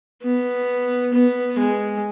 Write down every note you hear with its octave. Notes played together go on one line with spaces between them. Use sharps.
B3
B3
G#3